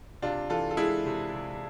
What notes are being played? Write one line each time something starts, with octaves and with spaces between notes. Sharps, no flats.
C3 D4 F4
E3 F4 A4
A4
G#3 E4 G#4
C3
C3